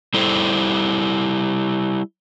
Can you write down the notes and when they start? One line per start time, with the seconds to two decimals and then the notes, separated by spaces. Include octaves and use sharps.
0.14 G3 E4 A4 C5